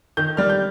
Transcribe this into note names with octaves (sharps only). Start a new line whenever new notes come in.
D#3 G6
G3 F6
G6